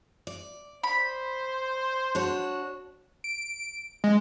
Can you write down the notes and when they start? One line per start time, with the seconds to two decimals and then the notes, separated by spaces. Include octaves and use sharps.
0.27 D5
0.83 C5 B5
2.15 D4 F#4 C#5
3.24 D7
4.04 G#3